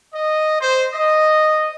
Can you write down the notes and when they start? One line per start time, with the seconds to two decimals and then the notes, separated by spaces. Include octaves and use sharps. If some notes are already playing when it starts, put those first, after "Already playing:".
0.14 D#5
0.61 C5
0.94 D#5